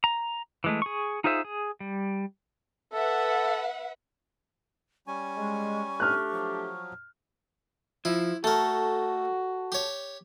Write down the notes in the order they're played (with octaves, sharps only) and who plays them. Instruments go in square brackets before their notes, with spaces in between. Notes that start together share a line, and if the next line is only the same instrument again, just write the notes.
[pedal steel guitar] A#5
E3 G#3 A3
G#4 C#6
D#4 F4 G#4 C5 E5
G#4
G3
[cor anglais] A4 [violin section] B4 E5 F#5
[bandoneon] G3 C#4 G#5 [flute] C#6
[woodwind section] G#3
[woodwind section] A3 D4 G4 [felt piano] F6 F#6
[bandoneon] F3 F#3
[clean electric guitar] F3 [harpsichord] E4
[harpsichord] A3 A#4 [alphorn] F#4 [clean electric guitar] A4
[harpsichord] G4 C#5